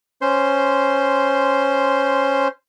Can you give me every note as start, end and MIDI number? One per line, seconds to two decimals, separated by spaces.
0.22 2.48 61
0.22 2.48 72
0.22 2.48 84